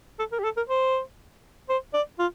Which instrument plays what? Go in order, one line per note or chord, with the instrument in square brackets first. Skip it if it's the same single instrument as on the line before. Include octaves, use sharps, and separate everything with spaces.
[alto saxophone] A4
A#4
G4
A4
A#4
C5
C5
D5
F4